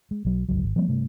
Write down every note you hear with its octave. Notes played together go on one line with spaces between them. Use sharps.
G#3
B1 F#3
G1 C#2 F#3
G#1
F3 G3 A#3 C4
G2 C3 A3